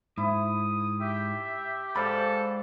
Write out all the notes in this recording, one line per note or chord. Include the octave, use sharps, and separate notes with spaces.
G#2 E4 D#6
G4 E5
G#2 A4 D5 F5 B5